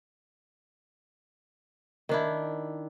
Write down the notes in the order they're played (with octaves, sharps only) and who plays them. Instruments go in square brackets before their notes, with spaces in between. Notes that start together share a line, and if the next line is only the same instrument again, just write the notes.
[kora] D#3 D4 E4